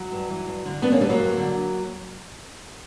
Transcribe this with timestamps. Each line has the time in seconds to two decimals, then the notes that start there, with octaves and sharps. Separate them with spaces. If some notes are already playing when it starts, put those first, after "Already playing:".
Already playing: F#3
0.12 G2
0.30 E3
0.47 G2
0.65 D3
0.82 G2 B3 D4
0.92 A#3 C#4
1.00 D3 G3 B3
1.09 F#3 A#3
1.18 G2
1.37 D3